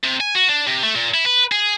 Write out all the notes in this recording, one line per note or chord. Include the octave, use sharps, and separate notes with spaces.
C3
G#5
F#4
D4
C3
A3
A#2
E4
B4
G#4